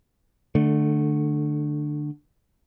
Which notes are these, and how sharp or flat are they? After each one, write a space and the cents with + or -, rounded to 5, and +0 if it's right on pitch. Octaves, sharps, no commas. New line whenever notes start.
D3 +20 A3 +0